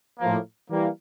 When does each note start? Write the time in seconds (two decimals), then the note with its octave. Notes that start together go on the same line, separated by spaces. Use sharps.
0.20 A2 F3 A#3
0.70 E3 G3 A#3